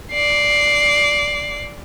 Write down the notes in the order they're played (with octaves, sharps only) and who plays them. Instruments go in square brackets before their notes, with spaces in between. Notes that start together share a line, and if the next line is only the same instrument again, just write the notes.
[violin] D5 C7